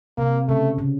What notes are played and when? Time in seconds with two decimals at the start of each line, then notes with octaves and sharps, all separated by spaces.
0.17 C3 A#3
0.48 C#3 A3
0.78 C#3